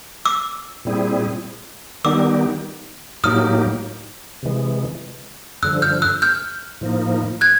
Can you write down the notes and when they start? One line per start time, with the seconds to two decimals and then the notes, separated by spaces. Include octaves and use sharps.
0.25 D6 E6
0.85 A#2 G3 C4 E4 G#4
2.04 D#3 G3 B3 D#4 G4 D6 E6
3.24 A2 F#3 A#3 D#4 G4 D#6 F6
4.43 C3 E3 G#3
5.63 G2 D3 F3 E6 F#6
5.82 F6 G6
6.02 E6 F#6
6.22 F6 G6
6.81 A2 F3 A#3 D#4
7.41 F#6 G#6